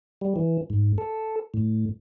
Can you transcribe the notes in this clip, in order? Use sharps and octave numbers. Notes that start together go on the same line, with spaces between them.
G3
E3
G#2
A4
A2